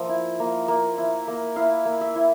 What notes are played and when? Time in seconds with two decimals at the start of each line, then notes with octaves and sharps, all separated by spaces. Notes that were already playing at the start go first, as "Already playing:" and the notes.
Already playing: F3 A#3 E5
0.09 E4
0.40 A#3
0.68 A#3
0.98 E4
1.28 A#3
1.56 E4 F5
1.85 A#3
2.01 E5
2.16 E4